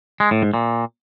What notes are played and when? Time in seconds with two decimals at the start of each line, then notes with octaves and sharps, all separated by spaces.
0.20 G#3
0.31 A2
0.42 G#2
0.54 A#2